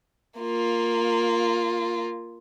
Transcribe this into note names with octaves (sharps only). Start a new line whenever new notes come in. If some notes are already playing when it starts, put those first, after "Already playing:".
A#3 F4